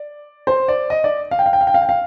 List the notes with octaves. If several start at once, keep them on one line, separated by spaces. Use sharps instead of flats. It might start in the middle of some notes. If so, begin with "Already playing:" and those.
Already playing: D5
C5
D5
D#5
D5
F5
G5
F5
G5
F5
G5
F5
G5
F5